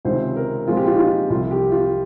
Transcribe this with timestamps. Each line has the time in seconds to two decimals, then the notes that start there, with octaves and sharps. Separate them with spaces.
0.05 C#2 C3 D#3 C5
0.36 A#4
0.67 A#2 F3 G#3 C4 F4
0.77 G4
0.86 F4
0.94 D#4
0.99 F4
1.30 C2 C3 F3 F4
1.51 G4
1.71 F4